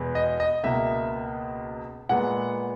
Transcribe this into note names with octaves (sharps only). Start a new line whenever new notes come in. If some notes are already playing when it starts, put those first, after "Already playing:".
Already playing: E2 B2 G#3 B3
D#5
D#5
C#2 B2 A#3 E5
A#2 G#3 B3 F#5